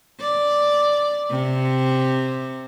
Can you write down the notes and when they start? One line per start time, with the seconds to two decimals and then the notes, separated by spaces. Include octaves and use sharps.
0.20 D5
1.30 C3